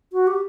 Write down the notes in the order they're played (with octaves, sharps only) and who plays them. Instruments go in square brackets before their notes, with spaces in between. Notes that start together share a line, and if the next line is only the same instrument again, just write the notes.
[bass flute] F#4
G4